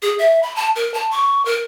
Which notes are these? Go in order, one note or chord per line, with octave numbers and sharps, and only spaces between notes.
G#4
E5
B5
A5
A#4
A5
C#6
A#4